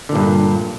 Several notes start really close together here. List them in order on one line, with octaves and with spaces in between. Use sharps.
D3 A#2 G2